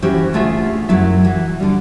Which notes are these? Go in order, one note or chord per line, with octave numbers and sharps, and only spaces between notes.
E3 C#4 E4 F#4 G4 C5
D2 A3 F4 G#4 E5
F#2 F#3 E4 E5
E3 F#4
D3 G3